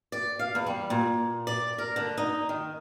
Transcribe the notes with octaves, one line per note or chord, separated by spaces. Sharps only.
D5
F5
E2
G3
A#2
D5
A#4
D3
D#4
D#3